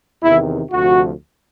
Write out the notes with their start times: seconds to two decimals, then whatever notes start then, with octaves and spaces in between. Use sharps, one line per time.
0.22 E2 C3 D#3 E4
0.72 D2 C3 F3 F#4